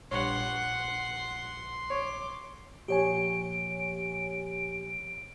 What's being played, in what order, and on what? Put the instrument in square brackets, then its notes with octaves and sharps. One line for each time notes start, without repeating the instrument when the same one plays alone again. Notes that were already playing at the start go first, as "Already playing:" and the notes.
[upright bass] A#1 [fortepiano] G2 C#5 [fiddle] F#5 [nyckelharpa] C6
[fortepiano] C#5 [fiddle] D6
[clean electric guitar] A#2 F3 C5 [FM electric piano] G4 C#5 G#5 [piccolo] D7